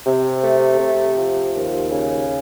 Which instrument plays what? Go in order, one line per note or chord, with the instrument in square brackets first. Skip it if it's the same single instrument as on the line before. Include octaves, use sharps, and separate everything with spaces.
[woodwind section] C3
A3
C3
F3
D#2
C#3